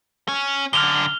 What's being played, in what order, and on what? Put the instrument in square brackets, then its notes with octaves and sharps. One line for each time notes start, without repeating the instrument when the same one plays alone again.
[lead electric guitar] C#4
[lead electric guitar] F#2 D3 [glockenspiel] F6 F7 G7